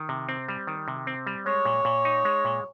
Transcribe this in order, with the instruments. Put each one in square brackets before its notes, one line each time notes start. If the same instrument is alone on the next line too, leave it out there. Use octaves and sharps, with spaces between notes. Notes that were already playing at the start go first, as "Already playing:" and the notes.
Already playing: [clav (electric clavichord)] D#3
C3
C4
G3
D#3
C3
C4
G3
[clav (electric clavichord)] G#3 [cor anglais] C#5
[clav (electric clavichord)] A#2
A#2
D#4
G#3
A#2